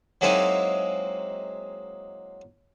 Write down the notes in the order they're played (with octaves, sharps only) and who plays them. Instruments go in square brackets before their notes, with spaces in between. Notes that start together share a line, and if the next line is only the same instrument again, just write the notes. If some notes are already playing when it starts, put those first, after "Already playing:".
[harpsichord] F#3 G#3 A#3 C4 D#4 E4